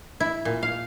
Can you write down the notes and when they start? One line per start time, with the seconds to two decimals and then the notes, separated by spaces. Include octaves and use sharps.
0.20 E4
0.45 A#2
0.63 F5